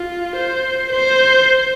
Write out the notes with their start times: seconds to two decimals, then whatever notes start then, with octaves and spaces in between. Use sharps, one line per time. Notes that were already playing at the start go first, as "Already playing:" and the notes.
Already playing: F4
0.36 C5
0.92 C5